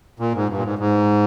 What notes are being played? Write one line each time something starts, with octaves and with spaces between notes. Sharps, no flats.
A#2
G#2
G2
A#2
G#2
G#2